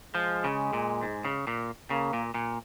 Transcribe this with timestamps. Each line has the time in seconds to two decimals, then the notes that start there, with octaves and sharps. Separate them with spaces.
0.15 F3 G#3
0.44 C#3
0.73 A#2
1.03 G#2
1.25 C#3
1.47 A#2
1.90 C#3 A#3
2.13 A#2
2.34 A#2